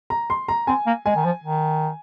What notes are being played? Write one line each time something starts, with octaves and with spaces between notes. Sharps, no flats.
A#5
C6
A#5
C4 G#5
A#3
G#3 G#5
D#3
F3
D#3